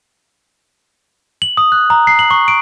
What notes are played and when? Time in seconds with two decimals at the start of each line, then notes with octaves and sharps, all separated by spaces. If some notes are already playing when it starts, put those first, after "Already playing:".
1.42 F#7
1.57 D#6
1.72 F#6
1.90 A#5
2.07 C7
2.19 F#7
2.31 C#6
2.48 D7